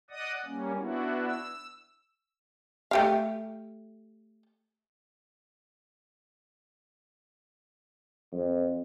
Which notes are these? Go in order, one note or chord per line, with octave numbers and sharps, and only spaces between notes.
D5 D#5 F#5 D#6
G3 A#3 C#4
B3 D4 E4 F#4
E6
A3 G4 F5
F2